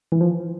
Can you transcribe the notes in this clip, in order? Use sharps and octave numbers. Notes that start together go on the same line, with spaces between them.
E3
F3